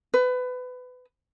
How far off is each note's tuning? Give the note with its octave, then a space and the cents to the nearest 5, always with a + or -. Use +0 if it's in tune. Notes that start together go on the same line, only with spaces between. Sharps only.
B4 +25